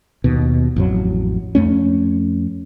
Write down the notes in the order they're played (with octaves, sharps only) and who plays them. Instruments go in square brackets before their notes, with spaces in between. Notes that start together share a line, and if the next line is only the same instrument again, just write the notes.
[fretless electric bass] D#2 B2
A1 F2 F#3
F2 A3 C#4